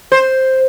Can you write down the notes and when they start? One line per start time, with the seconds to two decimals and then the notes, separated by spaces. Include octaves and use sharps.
0.12 C5